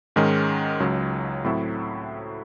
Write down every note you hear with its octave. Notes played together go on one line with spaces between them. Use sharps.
G#2 D#3 G#3 C#4
C#2 C#3 F#3
A2 F#3 C4 E4 A4